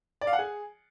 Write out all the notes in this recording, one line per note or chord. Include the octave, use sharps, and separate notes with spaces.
D5
F5
F#5
G#4